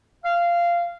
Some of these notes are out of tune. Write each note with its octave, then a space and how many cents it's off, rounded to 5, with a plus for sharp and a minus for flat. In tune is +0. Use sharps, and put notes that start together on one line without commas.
F5 -15